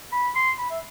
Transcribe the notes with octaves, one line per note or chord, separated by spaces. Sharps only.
B5
C6
B5
E5